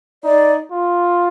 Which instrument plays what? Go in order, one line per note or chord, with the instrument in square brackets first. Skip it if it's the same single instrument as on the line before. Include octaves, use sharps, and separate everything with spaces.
[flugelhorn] D#4 [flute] D5
[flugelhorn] F4